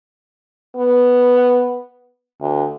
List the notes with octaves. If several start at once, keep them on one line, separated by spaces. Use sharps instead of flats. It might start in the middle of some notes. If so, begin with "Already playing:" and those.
B3
D2